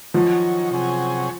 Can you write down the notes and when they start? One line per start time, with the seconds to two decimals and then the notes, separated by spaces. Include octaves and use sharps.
0.14 D#3 F3 F#3 C#4
0.71 C3 F#3 C#4 G#4